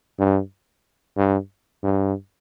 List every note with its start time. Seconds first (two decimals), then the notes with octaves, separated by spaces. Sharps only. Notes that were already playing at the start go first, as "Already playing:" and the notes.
0.19 G2
1.17 G2
1.83 G2